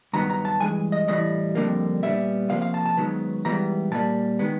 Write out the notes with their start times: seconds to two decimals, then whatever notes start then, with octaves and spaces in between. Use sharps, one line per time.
0.13 G2 D#3 F#3 B3 A#5
0.30 A#5
0.45 A5
0.60 G2 E3 G#3 G#5
0.92 D#5
1.08 A2 E3 G3 D#5
1.55 F2 D3 G3 A#3
2.03 A#2 G3 B3 E5
2.50 C3 F3 A#3 F5
2.62 F5
2.74 A5
2.86 A5
2.97 G#2 D#3 F#3 B3
3.45 G#2 E3 G3 B3 A#5
3.92 A#2 G3 A#3 A5
4.39 D#3 G#3 B3